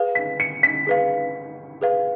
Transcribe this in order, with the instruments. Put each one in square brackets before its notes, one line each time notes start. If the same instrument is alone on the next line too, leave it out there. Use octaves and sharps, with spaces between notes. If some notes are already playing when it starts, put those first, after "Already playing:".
Already playing: [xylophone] G#4 B4 F5
[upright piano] B6
C#7
B6
[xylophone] G#4 B4 F5
G#4 B4 F5